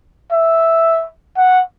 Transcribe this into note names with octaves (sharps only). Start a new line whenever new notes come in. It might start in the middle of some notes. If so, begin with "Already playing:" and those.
E5
F#5